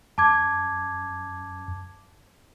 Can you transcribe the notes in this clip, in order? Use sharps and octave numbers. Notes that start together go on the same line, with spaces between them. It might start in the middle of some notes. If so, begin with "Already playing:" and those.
F#2 A5 D6 G#6